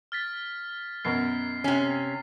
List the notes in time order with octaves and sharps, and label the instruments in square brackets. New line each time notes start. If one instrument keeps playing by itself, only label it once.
[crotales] F6 A6 B6
[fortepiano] F#2 B2 A#4 [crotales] C7
[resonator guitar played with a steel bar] C3 C#4